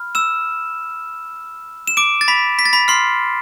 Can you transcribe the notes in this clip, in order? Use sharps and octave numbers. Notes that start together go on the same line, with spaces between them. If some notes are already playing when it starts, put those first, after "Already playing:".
Already playing: B5 F6
E6 E7
E7
D6 D7
A6
B5 B6
B6
A6
B5 B6
C6 F6 C7